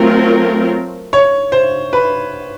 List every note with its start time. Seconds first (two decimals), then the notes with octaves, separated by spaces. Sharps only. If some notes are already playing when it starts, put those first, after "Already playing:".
Already playing: F#3 A3 C4 F4 A#4
1.13 C#5
1.52 C5
1.93 B4